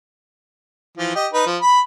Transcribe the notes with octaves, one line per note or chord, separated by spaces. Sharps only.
E3 F3
G4 D#5
D#4 B4
F3
B5